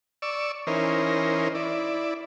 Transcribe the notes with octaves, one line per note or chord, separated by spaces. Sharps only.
D5 C#6 E6
E3 C#4 D#4 A#4 C5
E4 D5